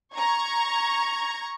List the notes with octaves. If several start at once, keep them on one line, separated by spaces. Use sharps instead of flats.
A#5 C#6 G#6